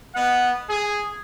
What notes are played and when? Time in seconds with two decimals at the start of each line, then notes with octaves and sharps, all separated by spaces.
0.15 B3 D#5 F#5
0.69 G#4